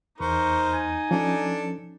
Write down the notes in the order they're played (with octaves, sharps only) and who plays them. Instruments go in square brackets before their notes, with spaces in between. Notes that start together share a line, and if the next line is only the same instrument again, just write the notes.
[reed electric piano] E2 [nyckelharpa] D#4 [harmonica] A#4 C5 [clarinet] C#6
[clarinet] G#5
[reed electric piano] F3 C#4 [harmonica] D4 A4